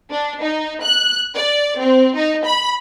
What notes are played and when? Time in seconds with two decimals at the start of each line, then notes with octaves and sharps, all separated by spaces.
0.11 D4
0.41 D#4
0.84 F#6
1.35 D5
1.80 C4
2.15 D#4
2.45 B5